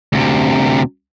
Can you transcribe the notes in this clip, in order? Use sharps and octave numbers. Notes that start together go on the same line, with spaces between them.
D2 C3